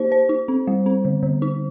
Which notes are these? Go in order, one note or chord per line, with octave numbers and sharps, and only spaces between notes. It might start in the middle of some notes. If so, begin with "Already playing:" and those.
Already playing: A#3 D#4 G4 C5
C5
D#4
C4
G3
C4
D3
D3
D#4